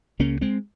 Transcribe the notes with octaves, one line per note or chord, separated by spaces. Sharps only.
C#2 C#3 A#3 C#4
G#3 C4